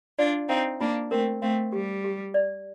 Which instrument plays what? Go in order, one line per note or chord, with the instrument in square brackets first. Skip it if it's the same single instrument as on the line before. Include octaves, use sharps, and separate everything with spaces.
[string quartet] D4 F4 [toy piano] D5
[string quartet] C4 D#4 [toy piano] F5
[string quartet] A#3 D4 [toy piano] F4
[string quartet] A3 C4 [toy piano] A#4
[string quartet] A3 C4 [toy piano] F5
[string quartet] G3 [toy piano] G4
[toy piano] G4
D5